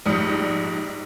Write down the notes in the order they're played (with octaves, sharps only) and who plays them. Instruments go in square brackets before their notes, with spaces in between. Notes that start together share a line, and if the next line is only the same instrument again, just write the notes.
[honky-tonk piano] A#1 G#2 G3 D#6 C#7